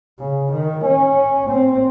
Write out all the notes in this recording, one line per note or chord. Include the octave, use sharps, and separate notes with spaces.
C#3
D#3
C#4
C4